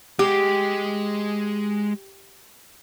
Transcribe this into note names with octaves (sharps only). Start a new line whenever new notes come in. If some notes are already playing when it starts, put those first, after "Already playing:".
G#3 G4